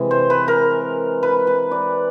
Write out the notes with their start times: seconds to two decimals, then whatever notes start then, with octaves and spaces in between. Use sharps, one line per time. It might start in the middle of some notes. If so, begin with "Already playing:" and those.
Already playing: C3 E3 G#3
0.11 C5
0.30 B4
0.48 A#4
1.23 B4
1.47 B4
1.71 D5